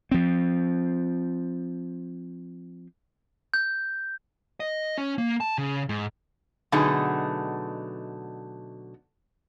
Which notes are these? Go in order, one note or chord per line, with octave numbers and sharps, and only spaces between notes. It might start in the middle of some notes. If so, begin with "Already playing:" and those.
F3 C4
G6
D#5
C#4
A#3
A5
C#3
G#2
B2 D3 F#3 A3 D#4 G#4